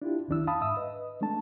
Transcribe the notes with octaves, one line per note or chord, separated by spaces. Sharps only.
D4 E4 F4 G4
C2 F2 D#3 D4 E4 E6
F5 A5 B5 D#6
G#2 E5 D#6 E6
B4 D#5
G#3 A3 D4 A5